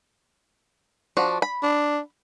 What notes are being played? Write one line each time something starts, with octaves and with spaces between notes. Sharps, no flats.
F3 D4 F#4
B5
D4